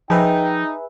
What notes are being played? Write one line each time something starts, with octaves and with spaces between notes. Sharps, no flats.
F3 D#4 G#4 B4 E5 G5